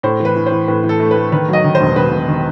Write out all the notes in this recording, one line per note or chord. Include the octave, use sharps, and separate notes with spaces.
A2 C5
E3
B4
E3
C5
E3
A2 B4
E3
A4
A3
B4
A3
D#3 B4
F#3 D#5
D#3
C5
E1
E1 B4
E1
D#3